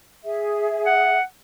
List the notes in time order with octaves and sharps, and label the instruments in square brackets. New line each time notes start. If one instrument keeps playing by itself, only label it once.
[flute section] G#4 E5
[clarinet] F#5